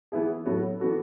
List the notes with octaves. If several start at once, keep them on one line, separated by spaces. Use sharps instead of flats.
E3 B3 E4 G#4
A2 F#3 B3 F#4 A4
E3 B3 F#4 A4